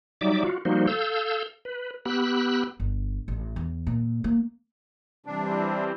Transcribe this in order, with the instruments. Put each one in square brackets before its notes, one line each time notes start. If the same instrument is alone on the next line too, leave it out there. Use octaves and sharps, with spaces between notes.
[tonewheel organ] F#3 G3 D#4 D5 E5 D6
F4 F#4
F3 G3 A#3 D#4 F#4 C5
A4 F5 E6 G6
B4
B3 G4 B5 E6 F#6
[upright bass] G1
A1
E2
A#2
A#3
[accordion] C3 D4 [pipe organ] E3 G3 C4